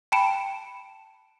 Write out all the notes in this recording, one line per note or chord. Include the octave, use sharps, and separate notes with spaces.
G5 A5 B5 C#7 D7 E7